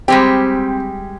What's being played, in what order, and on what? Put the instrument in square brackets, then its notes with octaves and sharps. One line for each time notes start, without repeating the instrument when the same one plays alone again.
[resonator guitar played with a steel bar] G3 G#3 G4 [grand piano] C4